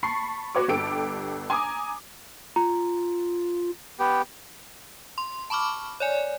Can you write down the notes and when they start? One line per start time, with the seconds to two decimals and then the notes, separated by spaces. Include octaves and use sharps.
0.03 A5 B5 C#6 C7
0.55 F#4 B4 C#5 C#6 D6
0.68 G1 G4 A4 D7
1.50 G#5 A#5 D6 D#6
2.56 F4 A#5
3.99 B3 G4
5.18 C6
5.50 A5 B5 C#6 D6 F6
6.00 C#5 D5 G#5